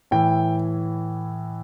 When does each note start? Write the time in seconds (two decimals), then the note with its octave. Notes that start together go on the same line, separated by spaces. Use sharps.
0.11 A2 E3 G5